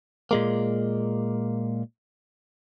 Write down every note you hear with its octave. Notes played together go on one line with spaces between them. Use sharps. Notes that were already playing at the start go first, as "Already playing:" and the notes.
A#2 G#3 A#3